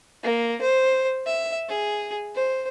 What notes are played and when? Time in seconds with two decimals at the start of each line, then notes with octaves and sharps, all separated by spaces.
0.23 A#3
0.61 C5
1.26 E5
1.69 G#4
2.35 C5